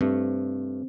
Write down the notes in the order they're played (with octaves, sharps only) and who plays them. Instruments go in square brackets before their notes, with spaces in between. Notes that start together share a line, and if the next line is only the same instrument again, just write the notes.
[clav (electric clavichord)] G2 A3 [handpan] C4